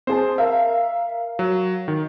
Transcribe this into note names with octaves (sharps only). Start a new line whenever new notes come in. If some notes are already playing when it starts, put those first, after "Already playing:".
C4 G#4 C5 A5
A#4 E5 F5
F#3
D#3